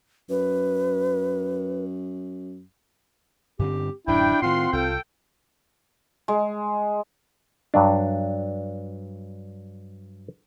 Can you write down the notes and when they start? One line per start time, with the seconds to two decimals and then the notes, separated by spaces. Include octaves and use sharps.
0.30 F#2 B4
3.59 G2 D3 C4 G4
4.07 D1 F#2 A2 D4 E4 G5
4.42 A2 D#3 C4 F4 F#5 C6
4.73 C2 F4 A4 G5
6.28 G#3
7.74 G2 F#3 D4